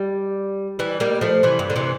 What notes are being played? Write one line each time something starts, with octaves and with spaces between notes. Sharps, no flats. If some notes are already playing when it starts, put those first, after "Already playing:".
Already playing: G3
E3 G3
G3 A#3
F3 A3
C3 E3
G2
D3
C3 E3